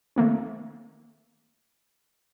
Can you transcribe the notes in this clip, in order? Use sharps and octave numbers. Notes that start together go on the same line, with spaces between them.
D#3 A3 A#3 C4